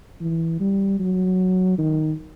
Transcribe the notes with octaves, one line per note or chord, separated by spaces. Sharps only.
E3
G3
F#3
D#3